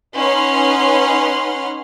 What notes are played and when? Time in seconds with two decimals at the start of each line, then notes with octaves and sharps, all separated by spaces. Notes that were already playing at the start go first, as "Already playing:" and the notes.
0.16 C#4 D#4 B4 F#5 C6 F6